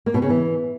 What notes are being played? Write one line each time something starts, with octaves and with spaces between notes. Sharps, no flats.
A#3
B2
C#3
E3